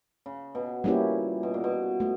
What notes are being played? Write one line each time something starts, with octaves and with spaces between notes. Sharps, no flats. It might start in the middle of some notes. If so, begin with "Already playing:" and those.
C#3
B2
A#2 G3 A#3 C#4 E4 G4
B2
A#2
B2
A3